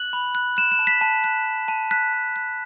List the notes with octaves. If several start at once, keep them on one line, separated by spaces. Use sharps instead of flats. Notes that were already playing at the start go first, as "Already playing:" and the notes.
Already playing: F#6 F#7
B5
F#6
F#6 E7
E7
A5
B6
A5
F#6
F#6
A5
F#6 B6
A5
F#6